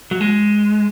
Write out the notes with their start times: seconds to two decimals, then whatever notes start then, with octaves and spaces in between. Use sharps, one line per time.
0.11 F#3
0.21 G#3